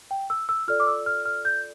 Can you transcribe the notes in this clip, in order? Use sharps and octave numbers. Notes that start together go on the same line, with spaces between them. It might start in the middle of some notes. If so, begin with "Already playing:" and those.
G5
E6
E6
F4 A4 D5 F6
D6
E6
F6
F6
G6